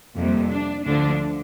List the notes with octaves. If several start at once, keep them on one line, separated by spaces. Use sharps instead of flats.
F2 C3 G3 A#3
D4
D2 D3 F3 D4